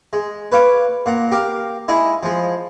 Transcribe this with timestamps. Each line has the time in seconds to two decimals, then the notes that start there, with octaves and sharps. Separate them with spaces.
0.13 G#3
0.52 B4 C#5 F5 D6
1.06 A#2 F#5 A#5
1.32 G4 A#4 F5
1.88 G#3 D#4 E4 G#4
2.23 F3 G#3